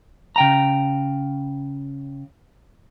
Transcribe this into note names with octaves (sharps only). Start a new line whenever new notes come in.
C#3 G5 A#5